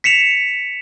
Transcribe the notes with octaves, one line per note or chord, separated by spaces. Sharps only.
B6 C#7 E7 F7